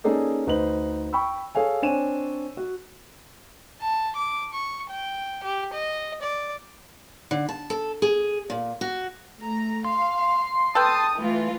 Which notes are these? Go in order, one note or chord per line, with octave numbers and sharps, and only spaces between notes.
A#3 C#4 D#4 G#4 A4 D5
D2 D#4 B4 C5 F#7
G5 B5 C#6 E6
G#4 A4 C#5 F5 G#5
C4 D4 C#5 G#5 D#7 E7
F#4
A5
D6
C#6
G5
G4
D#5
D5
D3
A5
A4
G#4
A#2
F#4
A3 A#5
F5 C6
A4 B4 G5 A5 D#6
E3 A3 F4